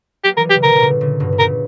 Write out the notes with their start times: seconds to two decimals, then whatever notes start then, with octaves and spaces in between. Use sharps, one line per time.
0.24 F#3 A#3 G4
0.37 E3 G3 A#4
0.50 G4
0.56 C#3
0.63 B2 D3 A#4
0.75 B2
0.82 A#2 C#3
1.01 A#2 C#3
1.20 G2 B2
1.32 B2
1.39 A#2 C#3 A#4